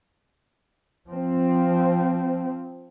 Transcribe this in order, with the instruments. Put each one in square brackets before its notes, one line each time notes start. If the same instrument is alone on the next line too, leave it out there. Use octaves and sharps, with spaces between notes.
[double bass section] F3 C4